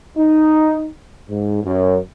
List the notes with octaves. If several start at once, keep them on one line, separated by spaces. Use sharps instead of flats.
D#4
G#2
F#2